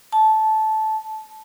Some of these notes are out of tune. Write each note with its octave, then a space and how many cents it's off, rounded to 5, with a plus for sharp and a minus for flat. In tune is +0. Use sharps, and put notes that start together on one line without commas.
A5 -15